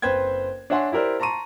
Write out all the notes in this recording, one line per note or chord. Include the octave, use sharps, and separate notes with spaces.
F#1 C4 B4 C5 G5 G#6
D4 C#5 E5 F#5 G#5 C6
E4 G4 A#4 C5 D5
A5 A#5 C6 C#6 D#7